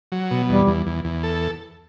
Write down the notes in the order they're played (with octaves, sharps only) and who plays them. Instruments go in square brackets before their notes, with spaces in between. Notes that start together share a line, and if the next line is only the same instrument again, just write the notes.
[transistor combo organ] F#3
B2
[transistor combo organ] E2 [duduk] G3
[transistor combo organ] E2
E2
E2
A4